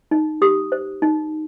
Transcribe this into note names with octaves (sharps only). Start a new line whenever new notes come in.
D#4
G4 D#6
C5
D#4